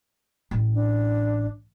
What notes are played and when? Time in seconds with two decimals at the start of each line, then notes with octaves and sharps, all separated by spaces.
0.51 A1
0.74 D4